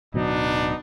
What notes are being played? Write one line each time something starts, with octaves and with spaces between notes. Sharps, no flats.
D1 B2 F#3 B3 D4 D#4